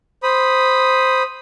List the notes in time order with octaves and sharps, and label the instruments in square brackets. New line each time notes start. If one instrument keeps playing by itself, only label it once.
[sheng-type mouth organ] C5 B5 D#6